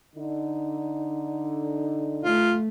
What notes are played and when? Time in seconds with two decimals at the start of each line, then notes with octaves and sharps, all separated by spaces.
0.16 D3 D#4
2.24 A3 F4